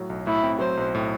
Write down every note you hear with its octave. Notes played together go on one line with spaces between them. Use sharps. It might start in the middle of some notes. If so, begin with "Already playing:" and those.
Already playing: A2 F#3
B1
A2 E4
C4
F#3 C5
B1
A2